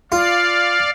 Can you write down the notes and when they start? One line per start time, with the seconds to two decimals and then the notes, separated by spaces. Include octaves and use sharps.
0.12 F4 D5 F5